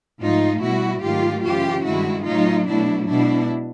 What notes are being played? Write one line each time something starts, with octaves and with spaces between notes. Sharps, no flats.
G#2 F3 A3 D#4 F4
B2 G3 E4 F#4
G#2 D#3 F#3 A3 F4 G4
F#2 C#3 E3 F4 G4
G2 D#3 G#3 E4 F#4
A2 F#3 A3 D#4 F4
B2 F#3 A3 D4 E4
B2 G#3 D4 E4